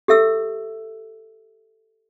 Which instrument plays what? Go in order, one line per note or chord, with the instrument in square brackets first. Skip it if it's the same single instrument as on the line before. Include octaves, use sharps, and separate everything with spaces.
[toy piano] G4 A4 E5 E6